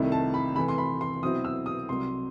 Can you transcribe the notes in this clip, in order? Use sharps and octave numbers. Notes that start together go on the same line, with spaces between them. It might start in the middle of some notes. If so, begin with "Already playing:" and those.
Already playing: C2 C3 D#3 A3 E4
A5
B5
C3 E3 A3 B5
C6
B5
C6
B2 F#3 C4 E4 D#6
E6
D#6
C2 C3 F#3 C6